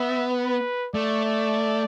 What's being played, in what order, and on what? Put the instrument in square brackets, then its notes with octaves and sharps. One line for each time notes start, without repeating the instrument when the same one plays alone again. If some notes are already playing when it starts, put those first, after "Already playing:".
Already playing: [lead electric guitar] B3 [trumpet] E5
[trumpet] B4
[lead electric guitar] A3 [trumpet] D5
[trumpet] D5